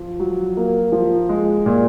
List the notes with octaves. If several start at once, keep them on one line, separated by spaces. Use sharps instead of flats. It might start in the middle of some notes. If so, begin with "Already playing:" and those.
Already playing: F3
F#3
A#3
F3
G#3
A#2